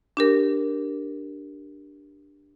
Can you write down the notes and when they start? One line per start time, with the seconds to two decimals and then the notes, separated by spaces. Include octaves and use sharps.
0.17 D4 G4 A#4